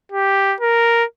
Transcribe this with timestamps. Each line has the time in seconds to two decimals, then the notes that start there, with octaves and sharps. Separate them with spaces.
0.12 G4
0.61 A#4